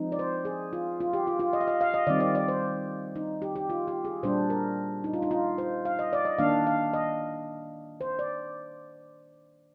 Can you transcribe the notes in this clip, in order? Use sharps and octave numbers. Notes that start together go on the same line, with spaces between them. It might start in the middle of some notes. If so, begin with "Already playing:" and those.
Already playing: F3 G#3 C4 D#4
D5
C5
G#4
F4
F4
G4
F4
F4
D#5
F5
D#5
F5
D#5
D#3 G3 C4 D5
D5
D5
C5
D#4
G4
G4
F4
G4
G#4
A#2 G3 D4 C5
A#4
D#4
F4
D#4
F4
C5
F5
D#5
D5
D#5
D#3 A#3 D4 F5
F5
D#5
C5
D5